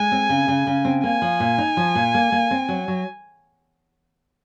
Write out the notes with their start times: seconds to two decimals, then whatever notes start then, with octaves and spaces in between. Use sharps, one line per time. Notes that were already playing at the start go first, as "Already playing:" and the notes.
Already playing: G#3 G#5
0.12 C4
0.29 C#3
0.48 C#3
0.67 C#3
0.85 C4
1.04 A#3 G#5
1.22 F3
1.40 A#2
1.58 D#4
1.77 F3
1.95 A#2
2.14 A#3
2.32 A#3
2.51 C4
2.69 F#3
2.88 F#3